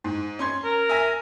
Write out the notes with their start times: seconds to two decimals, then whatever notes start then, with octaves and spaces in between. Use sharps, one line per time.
0.04 G#2
0.39 C#4 C6 G#6
0.64 A#4
0.89 E5 G#5 A#6